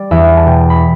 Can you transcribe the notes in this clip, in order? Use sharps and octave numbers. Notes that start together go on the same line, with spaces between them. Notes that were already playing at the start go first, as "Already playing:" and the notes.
Already playing: G3 D5
E2 E5
A5
B2 G5
B5